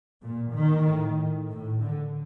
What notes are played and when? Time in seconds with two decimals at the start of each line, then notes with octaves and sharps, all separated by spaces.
0.21 A#2
0.53 D#3
0.85 A2
1.50 A2
1.82 D3